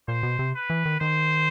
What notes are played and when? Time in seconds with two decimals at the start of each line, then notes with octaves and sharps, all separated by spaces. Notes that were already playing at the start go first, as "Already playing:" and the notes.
0.08 A#2 C5
0.23 B2
0.39 C3
0.55 B4
0.70 E3
0.85 D#3
1.00 D#3 C5